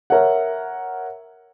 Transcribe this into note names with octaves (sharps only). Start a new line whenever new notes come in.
A#4 C#5 E5 F#5